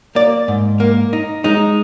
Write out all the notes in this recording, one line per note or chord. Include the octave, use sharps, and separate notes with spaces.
A#3 D5
G#2
A#3
D#4
G#3 D#4